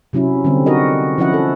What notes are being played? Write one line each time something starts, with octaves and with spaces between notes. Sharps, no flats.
C3 F#3 C#4 E4
D3 G3 C4
D#4 F#4 A#4 D#5
F3 C#4 E4 D#5 F#5
A4